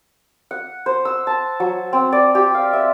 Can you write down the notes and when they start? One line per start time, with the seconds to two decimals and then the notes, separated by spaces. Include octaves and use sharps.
0.51 F#5
0.86 C5
1.05 E6
1.27 A5
1.60 F#3
1.93 C4
2.12 D5
2.35 G4
2.54 F5
2.73 E5